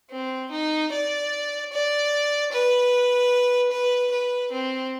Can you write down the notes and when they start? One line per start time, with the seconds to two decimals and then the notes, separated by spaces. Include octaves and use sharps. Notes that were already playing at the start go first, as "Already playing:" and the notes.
0.11 C4
0.51 D#4
0.92 D5
1.72 D5
2.52 B4
3.71 B4
4.12 B4
4.52 C4